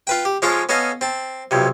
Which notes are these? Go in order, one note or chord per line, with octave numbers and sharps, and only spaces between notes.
F4 B4 G5
G4
F3 G#3 C#4 F4 A4 C#5
B3 C#4 A4 D#5 F5
C4 A5
B1 F2 C3